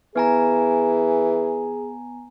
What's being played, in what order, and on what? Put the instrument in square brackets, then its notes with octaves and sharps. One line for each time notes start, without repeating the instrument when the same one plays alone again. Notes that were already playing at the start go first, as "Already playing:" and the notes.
[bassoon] E3 [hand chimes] B3 G#5 A#5 [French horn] G#4